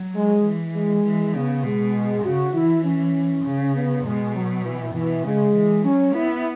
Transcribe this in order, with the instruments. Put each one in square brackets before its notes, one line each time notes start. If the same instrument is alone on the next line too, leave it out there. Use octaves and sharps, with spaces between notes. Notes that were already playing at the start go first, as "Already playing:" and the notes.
Already playing: [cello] F#3
[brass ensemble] G#3
[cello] E3
[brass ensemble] G#3
[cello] E3
[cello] C#3 [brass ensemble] B3
[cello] B2 [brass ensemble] G#3
[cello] C#3 [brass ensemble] F#4
[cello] E3 [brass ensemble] E4
[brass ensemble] C#4
[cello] C#3
[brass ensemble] B3
[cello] B2 [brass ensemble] G#3
[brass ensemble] F#3
E3
[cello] B2 [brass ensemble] E3
[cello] C#3 [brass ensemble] G#3
[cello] E3
[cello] F#3 [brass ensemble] C#4
[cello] B3 [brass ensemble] E4